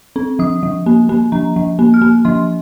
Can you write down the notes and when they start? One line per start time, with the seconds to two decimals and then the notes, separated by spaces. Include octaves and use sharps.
0.16 C4
0.39 F3 D#6
0.63 F3
0.86 A#3
1.09 A#3
1.32 F3 A#5
1.56 F3
1.79 A#3
1.94 F6
2.02 A#3
2.25 F3 C6